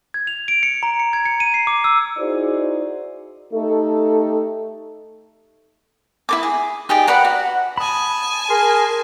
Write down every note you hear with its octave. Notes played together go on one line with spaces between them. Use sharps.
G#6
F7
D7
C#7
A#5
C#7
G#6
C#7
D#7
C7
D6
E6
D#4 E4 F#4 G#4 C5 D5
A3 D#4 G4 A4
E4 A#4 D6
G#4
D#4 G4 G#4 D5
B4 D5 F#5 A#5
F#4
G#5 A5 B5 D#6
G#4 A#4 C6